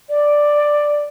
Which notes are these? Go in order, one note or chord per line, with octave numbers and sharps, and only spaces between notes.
D5